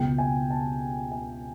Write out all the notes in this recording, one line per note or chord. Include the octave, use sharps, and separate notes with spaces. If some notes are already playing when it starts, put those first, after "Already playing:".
Already playing: C#2 B2 G5
G#5
A5
G#5